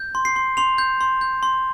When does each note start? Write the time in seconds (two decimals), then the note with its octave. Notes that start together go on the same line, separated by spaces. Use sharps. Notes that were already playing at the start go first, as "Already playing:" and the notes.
Already playing: G6
0.15 C6
0.25 C7
0.36 C6
0.57 C6 F7
0.78 G6
1.01 C6
1.21 G6
1.43 C6